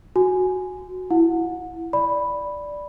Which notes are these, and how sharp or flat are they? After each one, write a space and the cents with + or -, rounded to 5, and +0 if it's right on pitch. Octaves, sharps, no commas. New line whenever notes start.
F#4 +0 G#5 +0
E4 +20 F#5 -30
D5 +0 B5 +0